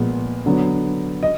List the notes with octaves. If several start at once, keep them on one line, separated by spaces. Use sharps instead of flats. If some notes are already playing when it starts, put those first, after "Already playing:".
Already playing: A#2 F3 G#3 B3
D3 F#3 B3
D#5